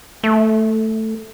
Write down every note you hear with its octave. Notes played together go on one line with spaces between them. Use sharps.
A3